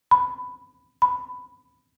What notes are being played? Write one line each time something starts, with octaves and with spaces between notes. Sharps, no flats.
B5
B5